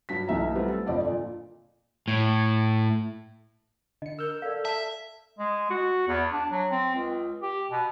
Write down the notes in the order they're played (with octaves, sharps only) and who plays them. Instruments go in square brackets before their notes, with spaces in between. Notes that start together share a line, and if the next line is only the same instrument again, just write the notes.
[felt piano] G2 F#3 B6
B1 E3 E5 A#5
G3 A3 B3 C4
A4
G1 F2 D5 D#5
A#2
[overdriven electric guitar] A2
[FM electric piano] D3 C#7 [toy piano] D#5
[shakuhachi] A#4 [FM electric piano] E6 F6 G6
[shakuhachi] A4 [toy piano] D5 F5
[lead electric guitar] E5 [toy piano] A5
[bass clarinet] G#3
F#4
E2
D4
F#3
C4
C#2
G4
B2